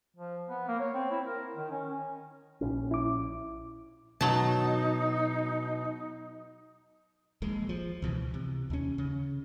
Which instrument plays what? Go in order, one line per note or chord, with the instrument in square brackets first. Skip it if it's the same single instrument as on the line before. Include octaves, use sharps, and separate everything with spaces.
[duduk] F3
B3
A#3
C#5
C4
E4
A#4
D#3
C#4
[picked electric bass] A#1 C#4
[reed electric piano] E4 D6
[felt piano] B2 [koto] F#3 A5 [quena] D#4
[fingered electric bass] D#1 A#1 G#3
F3
C#2 B2 E3
C3
D#2 C#4
C#3